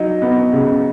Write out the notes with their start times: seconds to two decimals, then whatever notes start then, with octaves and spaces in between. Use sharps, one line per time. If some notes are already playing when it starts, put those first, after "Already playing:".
Already playing: F#3 D#4
0.22 B3
0.53 C#3